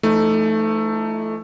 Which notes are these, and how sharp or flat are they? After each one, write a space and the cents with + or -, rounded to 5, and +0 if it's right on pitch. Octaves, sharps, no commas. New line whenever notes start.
E3 +45 A3 +0 D#4 +0